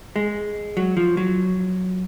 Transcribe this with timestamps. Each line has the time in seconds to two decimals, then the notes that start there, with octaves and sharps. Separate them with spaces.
0.16 G#3
0.77 F#3
0.97 F3
1.17 F#3